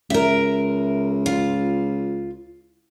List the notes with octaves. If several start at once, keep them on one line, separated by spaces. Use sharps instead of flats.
C#2 A#4 E5
F4